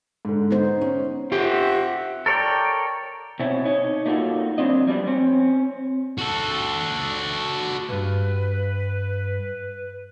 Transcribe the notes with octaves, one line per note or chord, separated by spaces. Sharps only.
G#2 D3
B3 D#4 C5
C#4
C4 F4 G4 E5 F#5
A4 A#4 C#5 D5 G5
B2 C4 C#4 E4
D#4 C#5 D#5
A3 A#3 D#4 F4 F#4 A4
F#3 C4 D4 D#5
F3 G3 B3 D4
C4 C#4
F#4 A4
C2 G2 B4